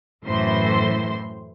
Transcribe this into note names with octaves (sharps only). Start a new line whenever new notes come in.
F#2 A2 E3 C5 C6